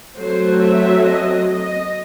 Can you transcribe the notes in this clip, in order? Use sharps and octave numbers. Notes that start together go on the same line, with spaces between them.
F#3 A3 C4 C5
E5
D#5
D#5